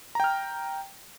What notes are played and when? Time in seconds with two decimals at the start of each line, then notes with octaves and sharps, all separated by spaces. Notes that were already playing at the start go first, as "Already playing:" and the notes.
0.15 A#5
0.20 G5
0.24 F6